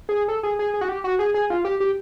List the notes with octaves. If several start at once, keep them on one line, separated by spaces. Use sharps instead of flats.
G#4
A4
G#4
G#4
G#4
F#4
G4
F#4
G#4
G#4
F4
G4
G4